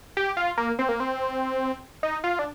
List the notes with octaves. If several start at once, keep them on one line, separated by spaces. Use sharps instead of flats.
G4
F4
A#3
C4
A#3
C4
D#4
F4
D4